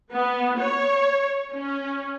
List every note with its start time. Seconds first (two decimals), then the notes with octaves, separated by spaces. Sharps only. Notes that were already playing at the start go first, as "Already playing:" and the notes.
0.13 B3
0.59 C#5
1.51 C#4